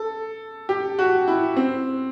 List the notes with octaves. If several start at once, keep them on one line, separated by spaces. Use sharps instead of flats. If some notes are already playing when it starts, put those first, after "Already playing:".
Already playing: A4
G4
F#4
E4
C4